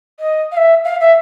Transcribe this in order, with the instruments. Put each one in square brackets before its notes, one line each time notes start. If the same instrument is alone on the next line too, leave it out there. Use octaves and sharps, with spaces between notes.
[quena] D#5
F5
E5
F5
E5